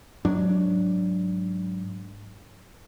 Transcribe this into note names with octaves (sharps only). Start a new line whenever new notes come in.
G#2 F#3 D4